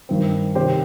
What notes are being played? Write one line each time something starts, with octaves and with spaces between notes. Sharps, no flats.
G2 D#3 C4
C3 D#3 C4 G4 C5